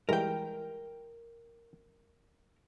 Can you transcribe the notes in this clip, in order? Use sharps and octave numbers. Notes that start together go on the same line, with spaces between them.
E3 G3 G#3 A#4 G5